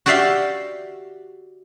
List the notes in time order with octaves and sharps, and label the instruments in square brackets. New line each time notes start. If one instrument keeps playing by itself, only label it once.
[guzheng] F#4 G4 D5 E5 F5 G5